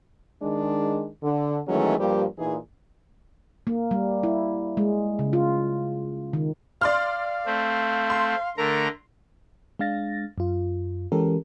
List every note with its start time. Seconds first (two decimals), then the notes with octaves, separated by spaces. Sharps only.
0.42 D#3 G#3 D4
1.23 D3
1.68 D#3 E3 F#3 G#3 A3 C#4
1.99 G2 F3 G3 A#3 G4
2.38 A#2 E3 D#4 G#4
3.67 A#3
3.91 G3
4.23 E4
4.77 G#3
5.19 C#3
5.33 F4
6.33 D#3
6.81 D5 F5 C6 F6
7.46 A3 C4
8.10 C6
8.58 D3 A3 A#4 A#5
9.79 G#3 D4 F5 A6 A#6
10.38 F#2 F4
11.12 E3 G#3 C#4 G4 A4 A#4